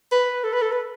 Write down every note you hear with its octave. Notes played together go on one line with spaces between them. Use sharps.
B4
A4
B4
A4
B4